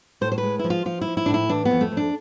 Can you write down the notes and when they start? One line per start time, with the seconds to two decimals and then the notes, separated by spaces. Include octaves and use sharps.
0.21 A2 C5
0.32 C5
0.38 B4
0.43 G#3
0.59 F3 E4
0.70 F4
0.85 F3 F4
1.01 E4
1.08 F3
1.17 E4
1.26 A2 D4
1.34 E4
1.49 E3 D4
1.65 B3
1.71 F2
1.81 A3
1.92 F2
1.97 D4